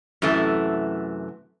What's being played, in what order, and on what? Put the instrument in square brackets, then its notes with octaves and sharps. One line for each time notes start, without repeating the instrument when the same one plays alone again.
[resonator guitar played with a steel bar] F#2 C3 E3 A3